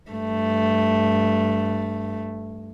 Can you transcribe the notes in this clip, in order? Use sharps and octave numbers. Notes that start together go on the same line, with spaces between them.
G2 A3